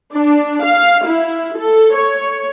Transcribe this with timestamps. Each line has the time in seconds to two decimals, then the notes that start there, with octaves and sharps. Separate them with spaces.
0.14 D4
0.65 F5
1.06 E4
1.59 A4
1.96 C#5